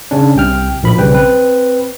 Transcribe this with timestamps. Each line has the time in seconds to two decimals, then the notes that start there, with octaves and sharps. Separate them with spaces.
0.11 C#3 C#4 D4
0.36 C2 C3 G5 F6
0.83 A#1 F3 B5
0.97 B1 C#3 G3 B4 G5
1.13 C4 B4